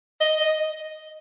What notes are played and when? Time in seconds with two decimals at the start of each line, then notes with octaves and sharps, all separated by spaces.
0.21 D#5
0.41 D#5